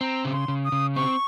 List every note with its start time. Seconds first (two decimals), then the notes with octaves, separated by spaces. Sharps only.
0.01 C4 A#5
0.25 C#3
0.32 C6
0.48 C#3
0.64 D#6
0.72 C#3
0.96 C4 C#6